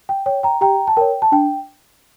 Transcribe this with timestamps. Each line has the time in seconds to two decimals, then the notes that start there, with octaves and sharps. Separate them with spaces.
0.09 G5
0.26 C#5 G5
0.43 G5 A#5
0.61 G4 G5 A#5
0.88 A5
0.97 A#4 C#5 G5
1.22 A5
1.32 D4 G5